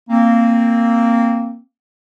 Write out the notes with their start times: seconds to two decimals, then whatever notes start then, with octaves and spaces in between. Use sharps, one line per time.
0.10 A#3 C4